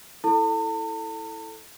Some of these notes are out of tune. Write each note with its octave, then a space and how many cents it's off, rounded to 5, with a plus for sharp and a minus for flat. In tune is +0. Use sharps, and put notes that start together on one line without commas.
E4 +0 A4 +0 A5 +45